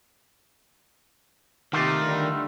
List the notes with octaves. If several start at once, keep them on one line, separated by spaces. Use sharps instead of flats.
C3 D#3 A3 A#3 F4 G4
D3 G3 D#4